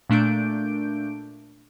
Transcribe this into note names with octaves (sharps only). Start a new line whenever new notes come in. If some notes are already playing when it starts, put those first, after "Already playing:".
A#2 A3 D4 G6 D7